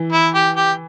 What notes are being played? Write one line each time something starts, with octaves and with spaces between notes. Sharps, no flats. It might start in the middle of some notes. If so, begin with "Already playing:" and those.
Already playing: E3
E4
G4
G4